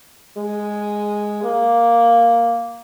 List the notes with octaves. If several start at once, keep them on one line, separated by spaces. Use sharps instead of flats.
G#3
A#3